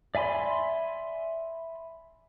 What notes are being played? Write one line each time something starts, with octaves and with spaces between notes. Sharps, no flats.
D5 E5 G#5 B5 C6